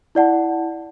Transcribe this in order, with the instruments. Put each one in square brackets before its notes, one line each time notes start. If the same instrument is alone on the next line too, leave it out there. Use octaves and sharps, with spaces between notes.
[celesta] E4 D5 F#5 A5